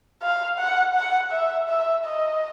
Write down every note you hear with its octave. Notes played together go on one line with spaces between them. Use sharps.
F5
F#5
F#5
E5
E5
D#5